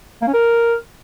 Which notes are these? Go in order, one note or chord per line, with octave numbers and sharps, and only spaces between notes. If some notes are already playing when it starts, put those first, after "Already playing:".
A#3
C#4
A#4